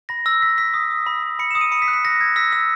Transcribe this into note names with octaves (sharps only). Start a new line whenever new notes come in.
B5 A#6
E6 A#6
E6 B6
E6 B6
D#6
D#6
B5
B5
B5 C#7
E7
D#6
D#7
B5 C#7
B6
F#6
B6
E6 A#6
E6 G#6
E6 B6
E6 B6